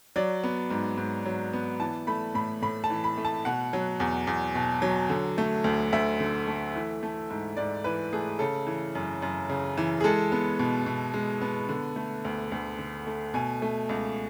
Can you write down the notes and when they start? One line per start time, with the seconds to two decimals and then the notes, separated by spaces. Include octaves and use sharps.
0.16 F#3 D5
0.44 B3
0.70 G#2
0.98 G#2
1.25 F#3
1.53 B3
1.80 E3 A5
2.07 A3 B5
2.35 A2 B5
2.62 A2 B5
2.84 A5
2.90 E3
3.04 B5
3.17 A3
3.25 A5
3.45 B2 F#5
3.73 F#3
4.00 E2
4.27 E2
4.55 B2
4.82 F#3
5.09 D3
5.38 A3
5.64 D2
5.93 D2 E5
6.20 D3
6.47 A3
6.75 E3
7.03 A3
7.30 G#2
7.57 G#2 D5
7.84 E3 B4
8.13 A3 G#4
8.39 C#3 A4
8.67 E3
8.95 F#2
9.22 F#2
9.49 C#3
9.78 E3
10.00 G#4
10.04 G#3 A4
10.32 B3
10.59 B2
10.86 B2
11.14 G#3
11.41 B3
11.69 D3
11.96 A3
12.25 D2
12.52 D2
12.78 D3
13.07 A3
13.34 B2 G#5
13.62 A3
13.89 C#2